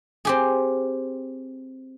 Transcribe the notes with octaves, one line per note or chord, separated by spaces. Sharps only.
C4 G4 G#4